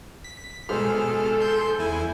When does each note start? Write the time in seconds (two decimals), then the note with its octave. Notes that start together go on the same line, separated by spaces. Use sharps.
0.24 B6
0.69 G#2 B2 G#4 A4 C5 F6
1.40 C6 G6
1.79 E2 E4 G#5